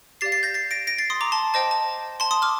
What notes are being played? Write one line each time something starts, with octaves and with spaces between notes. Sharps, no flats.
G4 D5 F5 A6 C7
A6 C7
G6 A#6
A6 C7
A#6 D7
A#6 D7
A6 C7
C6 D#6
A#5 D6
A5 C6
C5 D#5 G5 A5
A5
A5 C6
C6 D#6
D6 F6